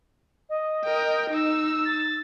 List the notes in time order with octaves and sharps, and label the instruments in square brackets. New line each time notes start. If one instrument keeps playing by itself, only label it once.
[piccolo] D#5
[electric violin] A#4 G5
D#4 E6
[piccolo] A6